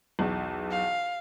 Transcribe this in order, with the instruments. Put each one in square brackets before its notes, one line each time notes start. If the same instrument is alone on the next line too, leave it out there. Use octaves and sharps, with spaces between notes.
[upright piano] B1 E2
[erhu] F5